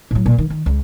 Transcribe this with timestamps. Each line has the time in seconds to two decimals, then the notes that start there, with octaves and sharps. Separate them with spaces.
0.11 A2 F#3
0.26 A#2
0.38 D#3
0.50 D#3
0.66 C#2